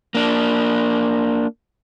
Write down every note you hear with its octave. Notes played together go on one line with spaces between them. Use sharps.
A#3 D4